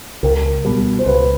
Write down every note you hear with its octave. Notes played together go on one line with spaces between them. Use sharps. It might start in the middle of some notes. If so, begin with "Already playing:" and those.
C#2 A#4
B2 G3
C5
C#2 B4